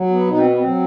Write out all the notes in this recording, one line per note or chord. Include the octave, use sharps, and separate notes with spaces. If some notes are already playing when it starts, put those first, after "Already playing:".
Already playing: F#3
B3
B2 D#4
C4
B3
C4
F#3